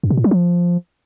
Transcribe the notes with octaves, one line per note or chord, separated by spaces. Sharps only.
F#2
B2
A2
F#3
F3